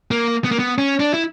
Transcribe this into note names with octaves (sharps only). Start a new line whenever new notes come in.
A#3
B3
A#3
B3
C#4
D4
E4